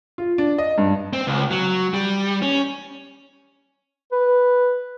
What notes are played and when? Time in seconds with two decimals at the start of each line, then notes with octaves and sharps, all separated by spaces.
0.18 F4
0.38 D4
0.58 D#5
0.78 G2
1.13 C4
1.27 C#2
1.51 F#3
1.94 G3
2.42 C#4
4.12 B4